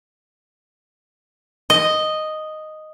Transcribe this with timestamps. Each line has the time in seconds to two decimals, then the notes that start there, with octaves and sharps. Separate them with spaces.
1.70 D#5